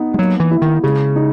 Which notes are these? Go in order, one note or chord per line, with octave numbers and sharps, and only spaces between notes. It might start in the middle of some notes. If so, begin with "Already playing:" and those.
Already playing: B3 D#4
G#3
F#3 A#3
E3
E4
D#3
C#3 G#3
D#4